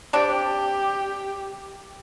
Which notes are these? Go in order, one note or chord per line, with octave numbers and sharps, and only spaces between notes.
C4 D4 G4 D5